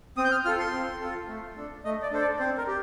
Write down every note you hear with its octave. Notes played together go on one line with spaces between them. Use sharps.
C4 D#6
G6
F6
F4 A4 F6
C6
C4
F4 A4
A3
D4 A4
A3 D#5
D5
D4 A4 C5
D5
C4 C5
A#4
G4